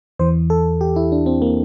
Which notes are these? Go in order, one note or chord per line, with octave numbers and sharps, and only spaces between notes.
E2 E3 C5
A4
G4
E4
D4
C4
A#3